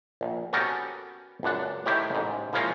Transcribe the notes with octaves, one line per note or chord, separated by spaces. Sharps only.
A#1
B3 C#4 F#4 G4 A4 A#4
C#2 F#2 D4 F#5
A2 D#3 E4 G4 C#5
A1 G#2
E3 F3 G#3 A#3 C#4 F4